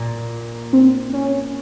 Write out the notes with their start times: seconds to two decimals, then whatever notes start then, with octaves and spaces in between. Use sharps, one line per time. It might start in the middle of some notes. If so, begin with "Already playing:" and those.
Already playing: A#2
0.73 C4
1.13 C#4